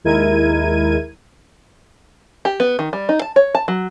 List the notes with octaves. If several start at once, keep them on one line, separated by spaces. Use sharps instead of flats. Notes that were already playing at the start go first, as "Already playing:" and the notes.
D#2 G#3 E4 A#4 G#6 D#7
G4
B3
D#3
G3
D#4
A5
C#5
A5
F#3